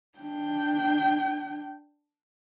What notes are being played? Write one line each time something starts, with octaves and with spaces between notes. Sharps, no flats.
D4 G5